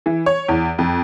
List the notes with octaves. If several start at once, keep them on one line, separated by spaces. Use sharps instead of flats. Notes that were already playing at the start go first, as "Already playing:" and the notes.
E3
C#5
E2
F2